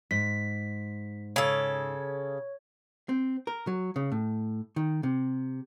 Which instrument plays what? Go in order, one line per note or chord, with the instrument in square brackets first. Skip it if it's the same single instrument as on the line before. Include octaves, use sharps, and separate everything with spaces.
[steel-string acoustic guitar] G#2 [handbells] B6
[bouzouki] C#3 A4 [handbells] C#5
[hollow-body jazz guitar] C4
A#4
F#3
C#3
A2
D#3
C3